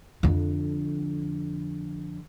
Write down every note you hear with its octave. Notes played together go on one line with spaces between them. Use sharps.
F2 D3